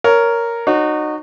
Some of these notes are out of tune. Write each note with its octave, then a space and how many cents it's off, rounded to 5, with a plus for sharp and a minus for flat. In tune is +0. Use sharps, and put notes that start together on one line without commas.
A#4 +0 C#5 +15
D#4 -30 F#4 +0 C#5 -35